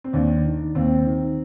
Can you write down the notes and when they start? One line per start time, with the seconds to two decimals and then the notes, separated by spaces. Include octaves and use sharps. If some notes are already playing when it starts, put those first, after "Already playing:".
0.04 C4
0.13 D#2 D4
0.45 D#3
0.75 D#2 C4
1.06 D#3